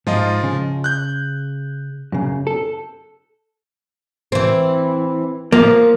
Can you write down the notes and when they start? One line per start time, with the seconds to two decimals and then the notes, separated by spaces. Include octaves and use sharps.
0.07 G#2 F3 F4 D#5
0.43 C#3
0.84 F#6 G6
2.12 F#2 C#3
2.47 A4
4.32 E3 C4
5.52 F3 A#3